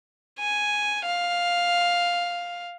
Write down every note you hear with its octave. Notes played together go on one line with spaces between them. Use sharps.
G#5
F5